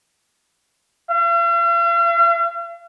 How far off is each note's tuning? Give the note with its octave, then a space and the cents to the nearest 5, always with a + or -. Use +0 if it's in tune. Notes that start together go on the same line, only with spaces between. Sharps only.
F5 -45